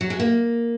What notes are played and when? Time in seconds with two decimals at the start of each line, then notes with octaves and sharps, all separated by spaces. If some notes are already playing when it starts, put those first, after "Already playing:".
0.01 F#3
0.10 G#3
0.20 A#3